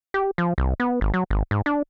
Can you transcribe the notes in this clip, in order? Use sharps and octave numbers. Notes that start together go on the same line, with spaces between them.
G4
F3
C2
B3
G#1
F#3
G#1
G#2
D4